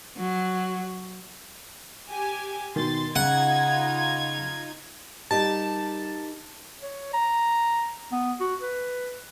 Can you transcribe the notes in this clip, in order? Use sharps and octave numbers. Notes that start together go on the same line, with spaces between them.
F#3
G4 G#5
B2 D#3 C6 A6
C#3 D#4 F4 F#5 G#6
G3 D#4 G4 A#4 A5
C#5
A#5
B3
F#4
B4